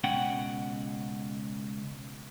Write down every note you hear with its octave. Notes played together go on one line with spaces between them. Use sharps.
C#2 B2 C#4 F#5 G5